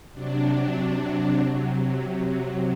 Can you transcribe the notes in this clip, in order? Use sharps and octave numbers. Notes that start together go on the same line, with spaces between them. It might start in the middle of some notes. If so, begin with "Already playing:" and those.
C3 F#3 D4
D4
C3 F#3